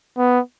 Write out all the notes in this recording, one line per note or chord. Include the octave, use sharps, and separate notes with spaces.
B3